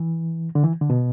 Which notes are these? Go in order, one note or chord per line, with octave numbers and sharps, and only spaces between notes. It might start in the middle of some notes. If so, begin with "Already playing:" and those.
Already playing: E3
D3
E3
D3
B2